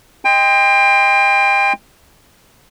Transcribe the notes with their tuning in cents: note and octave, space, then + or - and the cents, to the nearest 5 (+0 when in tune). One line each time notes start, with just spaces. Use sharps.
D#5 +0 G5 +30 C6 -15